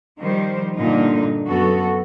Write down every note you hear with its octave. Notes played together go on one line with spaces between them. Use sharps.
D#3 F3 G3 C5
G2 A#2 D3 A#3 D#4
F#2 B3 F#4 A4